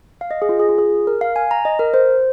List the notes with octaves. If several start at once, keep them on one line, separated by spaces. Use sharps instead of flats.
F5
D#5
G#4
F4
G#4
F4
G#4
A#4
F5
G#5
A#5
D#5
A#4
C5